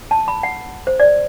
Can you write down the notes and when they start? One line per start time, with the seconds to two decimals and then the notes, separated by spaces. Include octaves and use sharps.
0.11 A5
0.28 B5
0.43 F#5
0.87 C5
1.00 D5